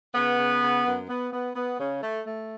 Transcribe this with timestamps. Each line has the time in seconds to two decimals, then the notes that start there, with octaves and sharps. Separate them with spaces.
0.15 C#3 B3
0.39 C#3
0.62 C#3
0.86 F#2
1.09 B3
1.33 B3
1.55 B3
1.80 C#3
2.03 A3
2.27 A3